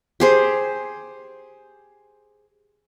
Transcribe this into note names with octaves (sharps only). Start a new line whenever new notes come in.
G4 G#4 C5